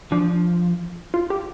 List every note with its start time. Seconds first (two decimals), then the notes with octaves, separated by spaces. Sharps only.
0.12 F3 D4
1.14 F4
1.30 G4